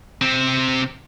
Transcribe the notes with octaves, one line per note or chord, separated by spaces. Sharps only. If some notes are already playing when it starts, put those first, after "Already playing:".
C3 C4